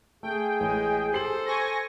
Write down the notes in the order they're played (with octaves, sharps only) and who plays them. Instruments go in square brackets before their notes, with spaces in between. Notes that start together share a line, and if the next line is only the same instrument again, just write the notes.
[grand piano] A3 [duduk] G#4 [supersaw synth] G5
[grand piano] A1 [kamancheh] G#3 D#5
[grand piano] G4 C7 F#7 [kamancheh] A4 C5
[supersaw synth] G#5 C#6 A#6